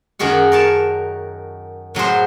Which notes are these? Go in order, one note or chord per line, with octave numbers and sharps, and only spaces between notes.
F#2 D#3 F#4 G#4 F#5
A#4 C#5 A5
A2 F#3 G#4 C5